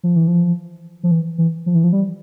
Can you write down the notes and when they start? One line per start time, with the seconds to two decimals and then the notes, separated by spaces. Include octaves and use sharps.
0.03 F3
0.16 E3
0.27 F3
1.03 F3
1.11 E3
1.38 E3
1.66 F3
1.75 E3
1.84 F3
1.93 G3